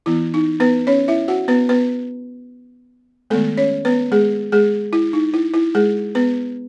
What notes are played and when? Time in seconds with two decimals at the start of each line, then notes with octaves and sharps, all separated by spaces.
0.06 E3 B3 E4
0.34 D#4
0.60 B3 B4
0.87 C#4 C#5
1.08 E4 E5
1.28 F#4 F#5
1.48 B3 B4
1.69 B3 B4
3.30 D#3 G#3 A3 B3 A4
3.57 C#4 C#5
3.85 B3 B4
4.12 G#3 G#4
4.52 G#3 G#4
4.93 E4
5.13 D#4
5.34 E4
5.54 E4
5.75 G#3 G#4
6.15 B3 B4